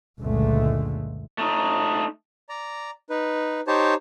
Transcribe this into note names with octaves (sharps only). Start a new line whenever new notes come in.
F#1 C#2 A#2 D3 G#3 A3
A3 D#4
D5 A#5
D#4 B4
D#4 G4 C5 C#5 A5